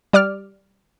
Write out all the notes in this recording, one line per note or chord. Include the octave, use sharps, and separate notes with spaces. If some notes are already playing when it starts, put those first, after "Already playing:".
G3 D5 D6 F6